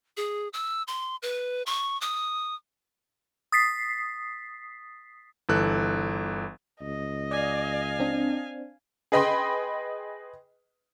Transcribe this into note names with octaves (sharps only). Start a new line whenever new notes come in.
G#4
E6
C6
B4
C#6
D#6
D#6 A6 B6 C7
G1 E3 A4 F#6
C#2 D#5
D5 F5 G#5
C4 D4
G#4 B4 D#5 G5 B5 C6